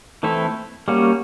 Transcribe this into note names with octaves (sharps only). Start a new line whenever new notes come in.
E3 A3 C4 E4 A4
G3 A#3 C#4 F#4